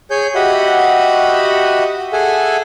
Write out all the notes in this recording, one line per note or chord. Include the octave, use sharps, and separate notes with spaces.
G#4 C#5 G#5 G6
F#4 G4 D#5 E5 F#5 B5
G#4 A4 E5 F#5 G#5